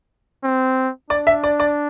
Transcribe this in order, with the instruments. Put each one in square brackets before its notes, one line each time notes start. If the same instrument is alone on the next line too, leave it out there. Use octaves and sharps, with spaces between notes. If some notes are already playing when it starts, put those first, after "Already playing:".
[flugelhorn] C4
[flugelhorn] D4 [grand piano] D5
[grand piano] E5
D5
D5